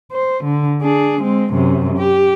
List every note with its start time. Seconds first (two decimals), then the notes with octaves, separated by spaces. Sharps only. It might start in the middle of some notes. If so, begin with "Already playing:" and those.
0.12 C5
0.44 D3
0.82 D4 G#4
1.22 G#3 C4
1.54 F#2 C3
1.98 G4